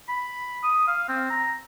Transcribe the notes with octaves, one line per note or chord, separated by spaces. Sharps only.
B5
D#6
F5
C4
A#5